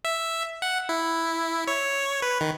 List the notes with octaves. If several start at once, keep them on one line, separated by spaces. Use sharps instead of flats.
E5
F#5
E4
C#5
B4
D#3